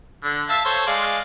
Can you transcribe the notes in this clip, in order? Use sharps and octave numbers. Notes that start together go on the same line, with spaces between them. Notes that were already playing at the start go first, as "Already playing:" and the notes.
D3
E5 F5 A5
A4 C5 C#5
G#3 D5 F5